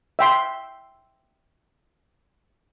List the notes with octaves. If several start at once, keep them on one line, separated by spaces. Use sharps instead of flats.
E5 G5 C6